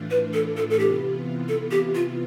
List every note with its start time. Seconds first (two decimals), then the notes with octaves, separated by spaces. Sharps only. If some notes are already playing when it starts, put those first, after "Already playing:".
Already playing: A2 E3 A3 D4 F4
0.11 B4
0.34 A4
0.57 A4
0.70 A4
0.79 C3 E3 B3 F4 G4
1.49 A4
1.71 G4
1.95 F4